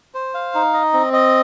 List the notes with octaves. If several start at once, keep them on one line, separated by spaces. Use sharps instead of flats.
C5
F5
D#4
D#5
C4
D#5